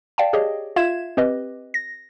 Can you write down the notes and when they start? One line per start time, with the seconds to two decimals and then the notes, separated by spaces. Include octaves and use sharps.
0.18 D5 F5 G5 A5
0.33 G4 G#4 C#5 D#5
0.76 F4 E5 F5 G#6 E7
1.17 C4 G4 B4 D#5
1.74 A#6